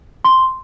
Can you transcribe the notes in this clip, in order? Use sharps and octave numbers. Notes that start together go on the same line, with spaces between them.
C6